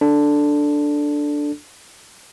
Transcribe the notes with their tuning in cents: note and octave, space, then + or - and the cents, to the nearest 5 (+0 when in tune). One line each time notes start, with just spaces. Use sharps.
D4 +0 A4 +0